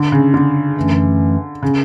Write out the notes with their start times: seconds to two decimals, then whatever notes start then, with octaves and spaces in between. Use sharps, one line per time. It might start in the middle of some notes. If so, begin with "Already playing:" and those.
Already playing: D3
0.12 C#3
0.34 D3
0.77 F#2 E3 A3 C#4
1.63 C#3